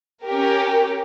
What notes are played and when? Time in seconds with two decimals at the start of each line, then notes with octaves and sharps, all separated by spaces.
0.24 C#4 G4 A#4